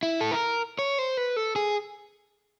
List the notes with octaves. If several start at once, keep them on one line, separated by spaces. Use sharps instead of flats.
E4
A4
A#4
C#5
C5
B4
A4
G#4